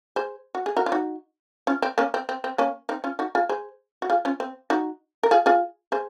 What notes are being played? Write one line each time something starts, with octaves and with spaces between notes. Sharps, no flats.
G#4 C5
F#4
G#4
F#4 A#4
F4
D#4 F#4
C#4 F4
C4
A#3 C#4
C4
C4
C4
A#3 C#4
C4 D#4
C#4 F4
D#4 F#4
F4 G#4
G#4 C5
F#4
F4 G#4
C#4 F4
C4
D#4 F#4
A#4
F4 G#4
F4 G#4
G#4 C5